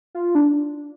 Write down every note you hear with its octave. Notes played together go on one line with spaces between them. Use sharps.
F4
D4